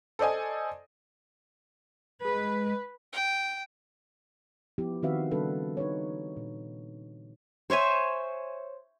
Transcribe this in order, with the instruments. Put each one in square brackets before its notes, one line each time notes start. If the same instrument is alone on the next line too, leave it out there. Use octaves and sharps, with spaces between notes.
[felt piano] A4 C5 D5 D#5 G#5
[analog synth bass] G#3 [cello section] B4
[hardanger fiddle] G5
[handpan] F3 B3 E4 G4
D#3 C4 F#4 B4 E5 F5
C#3 G3 B3 D4 A4 B4
D#4 B4 C#5
A#2
[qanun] C5 C#5 E5 G#5